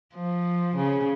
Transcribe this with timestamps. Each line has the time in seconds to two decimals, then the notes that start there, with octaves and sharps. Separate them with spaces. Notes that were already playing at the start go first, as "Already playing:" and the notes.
0.14 F3
0.76 C#3